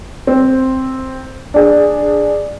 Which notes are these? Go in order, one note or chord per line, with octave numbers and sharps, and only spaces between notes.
C4
D4 G#4